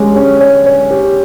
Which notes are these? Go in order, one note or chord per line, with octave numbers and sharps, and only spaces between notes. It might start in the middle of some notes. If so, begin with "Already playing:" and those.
Already playing: G#3 C#4 G4
C#4
C#5
C#5
G4